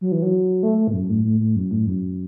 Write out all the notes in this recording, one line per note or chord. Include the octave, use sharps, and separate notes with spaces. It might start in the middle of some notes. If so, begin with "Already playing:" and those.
F#3
E3
F#3
A3
A3
A2
F#2
A2
A2
A2
F#2
A2
F#2